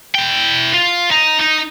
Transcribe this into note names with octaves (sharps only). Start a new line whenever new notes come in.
E4 G5
F4
D#4
D#4